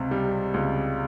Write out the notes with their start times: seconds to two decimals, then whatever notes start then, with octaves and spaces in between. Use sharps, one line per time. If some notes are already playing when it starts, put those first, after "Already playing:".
Already playing: C#2 C3
0.11 G3
0.54 C#2